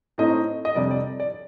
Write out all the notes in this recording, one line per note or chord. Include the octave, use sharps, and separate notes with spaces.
A2 A3 C4 D#4 D#5
D#5
F2 C3 G3 D4 D5
D5
D5